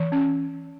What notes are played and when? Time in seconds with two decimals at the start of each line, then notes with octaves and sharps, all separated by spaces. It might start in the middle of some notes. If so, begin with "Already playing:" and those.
Already playing: E3
0.12 C#4